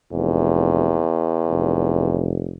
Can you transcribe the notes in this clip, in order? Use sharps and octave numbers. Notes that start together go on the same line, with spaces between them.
F1 E2
F1